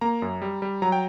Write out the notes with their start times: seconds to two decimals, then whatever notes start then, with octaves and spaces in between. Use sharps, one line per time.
0.01 A#3 A#5
0.22 F#2
0.42 G3
0.62 G3
0.82 F#3 A#5
0.92 G5